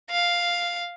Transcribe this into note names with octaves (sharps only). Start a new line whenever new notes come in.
F5